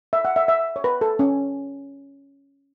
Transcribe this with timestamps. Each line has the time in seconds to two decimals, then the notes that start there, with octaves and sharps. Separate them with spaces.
0.13 E5
0.25 F#5
0.36 E5
0.48 E5
0.76 C#5
0.84 B4
1.01 A4
1.19 C#4